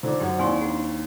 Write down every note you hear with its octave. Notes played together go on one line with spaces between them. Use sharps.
D3 D#4 F4 A4 C5 D5 D6
F#2 G4 C#5 F#5
D#2 C4 E4 D5 G#5 C6 C#6
D4 G#4 F#5